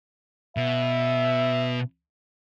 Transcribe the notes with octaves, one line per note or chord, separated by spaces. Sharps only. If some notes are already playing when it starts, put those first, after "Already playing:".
B2 E5